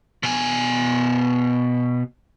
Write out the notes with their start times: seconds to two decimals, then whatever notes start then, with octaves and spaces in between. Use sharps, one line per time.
0.23 B2 G#5